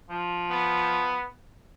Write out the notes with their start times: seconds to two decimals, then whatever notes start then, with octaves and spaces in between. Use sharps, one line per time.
0.10 F3
0.50 B3